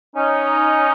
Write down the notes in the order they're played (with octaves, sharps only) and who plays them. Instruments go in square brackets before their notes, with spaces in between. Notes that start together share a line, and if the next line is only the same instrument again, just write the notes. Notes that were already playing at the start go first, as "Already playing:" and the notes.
[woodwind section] C#4 D#4